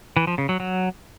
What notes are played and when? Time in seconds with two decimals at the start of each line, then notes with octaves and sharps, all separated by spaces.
0.17 E3
0.27 F3
0.38 C#3
0.49 F#3
0.60 F#3